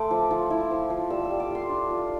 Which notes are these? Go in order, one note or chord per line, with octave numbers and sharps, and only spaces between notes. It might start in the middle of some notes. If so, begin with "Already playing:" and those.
Already playing: A3 A5 C6 D6
F3
F3
E4
F3
F3
G3 E6
E6
G3
D6
F4 C6
D4
F4